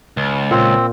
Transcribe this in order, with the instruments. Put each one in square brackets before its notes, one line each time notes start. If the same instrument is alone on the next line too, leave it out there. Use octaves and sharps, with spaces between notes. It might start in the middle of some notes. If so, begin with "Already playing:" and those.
[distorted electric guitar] C#2
[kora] A#2 [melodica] C4